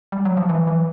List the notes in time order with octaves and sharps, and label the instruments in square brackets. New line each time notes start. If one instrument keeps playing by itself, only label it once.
[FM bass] G3
F#3
F3
E3
E3